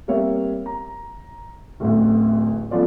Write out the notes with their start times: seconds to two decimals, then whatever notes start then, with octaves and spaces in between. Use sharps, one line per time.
0.08 G3 A#3 C4 C#5 E5
0.66 A#5
1.80 D1 A1 D2
2.71 F3 A3 B3 C#4 F4 D5